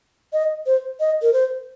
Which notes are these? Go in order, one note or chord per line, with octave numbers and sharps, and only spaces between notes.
D#5
C5
D#5
A#4
C5